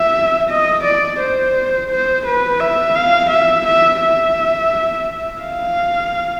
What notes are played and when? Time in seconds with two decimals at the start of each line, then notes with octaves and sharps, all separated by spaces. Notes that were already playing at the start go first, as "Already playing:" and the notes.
Already playing: E5
0.50 D#5
0.84 D5
1.20 C5
1.90 C5
2.26 B4
2.60 E5
2.95 F5
3.31 E5
3.67 E5
4.01 E5
5.42 F5